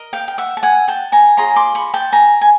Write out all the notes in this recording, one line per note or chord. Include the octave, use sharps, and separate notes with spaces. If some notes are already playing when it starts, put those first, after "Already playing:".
Already playing: A#4 D#5
F5 G5
G5
E5 F#5
A5
F#5 G#5
G5 A5
G#5 A#5
F4 G#4 C#5 A#5 C6
C6 D6
B5 C#6
G5 A5
G#5 A#5
G#5